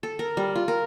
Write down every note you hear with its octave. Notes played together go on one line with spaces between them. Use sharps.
A4
A#4
G3
F4
A#4